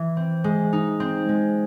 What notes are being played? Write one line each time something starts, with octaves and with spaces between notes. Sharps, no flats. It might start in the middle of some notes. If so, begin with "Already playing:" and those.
Already playing: E3
C4
G#3
D#4
C4
G#3